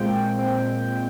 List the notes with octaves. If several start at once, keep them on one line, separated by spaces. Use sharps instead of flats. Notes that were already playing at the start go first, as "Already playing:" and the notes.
Already playing: A#2 G#3 C4 G5
A#2 G#3 C4